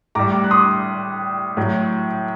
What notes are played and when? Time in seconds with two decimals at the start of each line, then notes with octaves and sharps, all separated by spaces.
0.15 A2 G3 A#5 D6
0.44 F#6
0.51 C6 D#6
1.57 A2 F#3